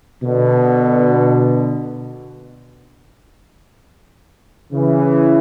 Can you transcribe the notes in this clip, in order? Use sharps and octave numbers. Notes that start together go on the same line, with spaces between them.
B2 D3
C#3 E3